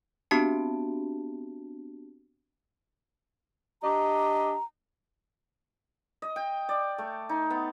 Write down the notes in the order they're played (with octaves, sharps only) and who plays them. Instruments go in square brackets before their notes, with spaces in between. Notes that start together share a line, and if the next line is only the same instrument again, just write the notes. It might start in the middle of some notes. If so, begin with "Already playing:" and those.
[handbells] B3 C4 D4 F#4 G4 A5
[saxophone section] D4 G4 D#5 [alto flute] A#5
[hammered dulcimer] D#5
G5
D5
A3
D#4
B3